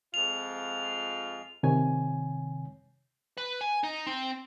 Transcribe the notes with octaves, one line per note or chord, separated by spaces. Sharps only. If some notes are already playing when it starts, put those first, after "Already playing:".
F2 G#3 F4 F7
C3 D#3 C#5 G#5
B4
G#5
D#4
C4